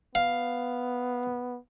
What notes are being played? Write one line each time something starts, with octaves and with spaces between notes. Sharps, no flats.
B3 F5